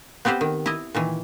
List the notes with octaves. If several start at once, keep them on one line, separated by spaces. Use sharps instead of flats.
B3 C4 G4 B4 C5
D#3
E4 D#5
A#2 D#3 E3